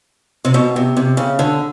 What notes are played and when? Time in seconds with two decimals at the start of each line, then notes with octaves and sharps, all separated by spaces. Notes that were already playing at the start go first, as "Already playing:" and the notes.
0.45 C3
0.54 B2
0.76 C3
0.97 C3
1.17 C#3
1.39 D3